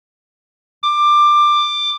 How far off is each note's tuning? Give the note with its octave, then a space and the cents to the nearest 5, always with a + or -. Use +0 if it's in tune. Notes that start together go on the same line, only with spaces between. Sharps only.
D6 +15